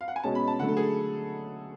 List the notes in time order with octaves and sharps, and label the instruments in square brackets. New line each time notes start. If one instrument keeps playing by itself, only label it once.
[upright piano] F5
F#5
G#5
[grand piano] B2 G#3 C#4 [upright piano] A5
[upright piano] B5
A5
[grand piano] D3 F#3 A3 [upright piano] F#5
[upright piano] A4
G#4